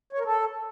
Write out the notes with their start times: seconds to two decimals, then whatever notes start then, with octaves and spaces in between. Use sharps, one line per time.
0.13 C#5
0.19 A#4
0.26 A4